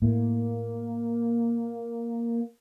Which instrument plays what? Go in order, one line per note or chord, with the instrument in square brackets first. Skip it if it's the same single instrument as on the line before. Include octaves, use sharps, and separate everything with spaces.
[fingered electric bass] A2 [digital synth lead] A#3